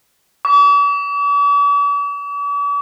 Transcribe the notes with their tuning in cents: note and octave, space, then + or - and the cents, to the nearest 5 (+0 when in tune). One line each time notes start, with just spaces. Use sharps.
D6 -45